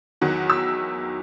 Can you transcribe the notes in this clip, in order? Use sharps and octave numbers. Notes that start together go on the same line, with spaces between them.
E2 D#3 F#3 F#5
E6